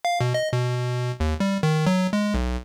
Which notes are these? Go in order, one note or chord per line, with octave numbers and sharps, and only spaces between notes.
F5
B2
D#5
B2
D#2
G3
D#3
F#3
G#3
B1